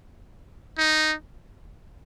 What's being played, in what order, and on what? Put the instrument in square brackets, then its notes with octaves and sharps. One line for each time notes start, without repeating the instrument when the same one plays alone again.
[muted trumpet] D#4